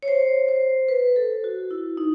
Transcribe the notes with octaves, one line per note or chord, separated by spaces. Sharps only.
C#5
C5
C5
B4
A4
F#4
E4
D#4